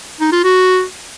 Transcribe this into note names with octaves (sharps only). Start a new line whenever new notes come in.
D#4
F4
F#4